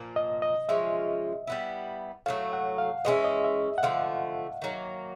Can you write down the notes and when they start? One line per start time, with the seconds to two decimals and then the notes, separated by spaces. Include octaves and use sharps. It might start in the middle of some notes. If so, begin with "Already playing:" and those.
Already playing: A#2 F3 A#3
0.16 D#5
0.42 D#5
0.69 F3 G#3 C#4 F4 E5
1.47 G3 B3 E4
2.26 A2 F#3 A3 F5
2.53 F#5
2.78 F5
3.05 E3 G#3 C#4 E4 D#5
3.24 D#5
3.44 E5
3.78 F#5
3.83 D3 F3 A3 F5
4.62 D#3 F#3 A#3